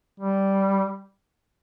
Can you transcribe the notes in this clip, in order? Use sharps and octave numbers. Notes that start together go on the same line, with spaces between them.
G3